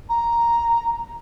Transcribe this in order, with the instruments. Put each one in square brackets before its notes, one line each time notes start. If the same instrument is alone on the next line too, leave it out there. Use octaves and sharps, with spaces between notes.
[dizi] A#5